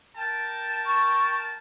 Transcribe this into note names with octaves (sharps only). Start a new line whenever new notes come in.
A#4 G5 A5
C#6